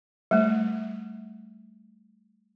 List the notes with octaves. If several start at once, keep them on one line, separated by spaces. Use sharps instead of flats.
G3 A3